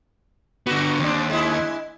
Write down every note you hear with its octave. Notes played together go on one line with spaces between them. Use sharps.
D3 B3 F#4
D#2 C4 D4
G#3 E4